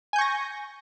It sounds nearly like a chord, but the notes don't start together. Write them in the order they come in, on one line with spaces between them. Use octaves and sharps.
G#5 G6 C#6 A#6